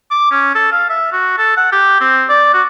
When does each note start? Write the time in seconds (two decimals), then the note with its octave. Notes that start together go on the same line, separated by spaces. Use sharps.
0.11 D6
0.31 C#4
0.55 A4
0.72 F5
0.90 E5
1.13 F#4
1.38 A4
1.57 F#5
1.72 G4
2.01 C4
2.29 D5
2.54 F#4